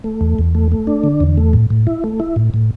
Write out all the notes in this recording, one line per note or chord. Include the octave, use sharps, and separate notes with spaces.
A3
E2
E2
A3
A3
D4
D3
E2
A3
A2
A2
E4
A3
E4
A2
A2